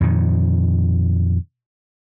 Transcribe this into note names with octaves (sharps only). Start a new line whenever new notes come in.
F2 A#2 D#3